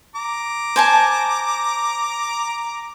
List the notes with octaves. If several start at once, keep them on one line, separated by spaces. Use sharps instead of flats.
A#5 D6
C5 G#5 A5